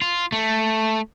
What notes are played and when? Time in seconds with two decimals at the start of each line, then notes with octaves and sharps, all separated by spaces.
0.01 F4
0.32 A3